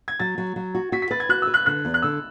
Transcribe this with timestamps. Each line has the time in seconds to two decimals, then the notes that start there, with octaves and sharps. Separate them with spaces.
0.08 G#6
0.20 F#3 A6
0.38 F#3
0.56 F#3
0.75 F#4
0.92 F#4 B6
1.02 B6
1.11 B4 A6
1.20 G#6
1.29 F#4 F#6
1.42 E6
1.47 B4
1.54 F#6
1.66 D3 F#6
1.85 E2
1.94 F#6
2.02 D3 E6